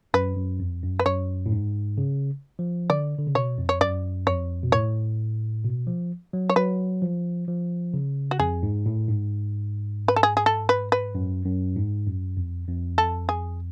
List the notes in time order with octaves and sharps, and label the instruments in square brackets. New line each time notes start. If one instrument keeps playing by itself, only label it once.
[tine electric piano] F#2 [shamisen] B4
[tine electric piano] F#2
F2
F#2
[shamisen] B4
[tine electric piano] F#2 [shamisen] C#5
[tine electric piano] A2
G#2
C#3
F3
[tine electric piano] D3 [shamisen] D5
[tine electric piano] D3
C#3
[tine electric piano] B2 [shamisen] C#5
[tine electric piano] F2
[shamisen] C#5
[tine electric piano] F#2 [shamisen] D5
[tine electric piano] F2 [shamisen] C#5
[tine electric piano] B2
[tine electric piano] A2 [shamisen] C#5
[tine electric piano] B2
F3
F#3
[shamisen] C#5
[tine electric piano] F#3 [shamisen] B4
[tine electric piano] F3
F3
C#3
[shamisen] F#4
[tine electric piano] F2 [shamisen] G#4
[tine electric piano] G#2
A2
G#2
[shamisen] B4
A4
G#4
G#4
A4
B4
B4
[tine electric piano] F#2
F#2
G#2
F#2
F2
F2
[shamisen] A4
G#4